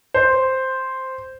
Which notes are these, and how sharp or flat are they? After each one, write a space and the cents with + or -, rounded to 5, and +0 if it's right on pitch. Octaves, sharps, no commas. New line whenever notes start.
C5 +0